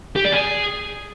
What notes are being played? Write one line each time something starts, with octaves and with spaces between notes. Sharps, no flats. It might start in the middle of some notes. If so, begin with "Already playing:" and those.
G4
D5
G#4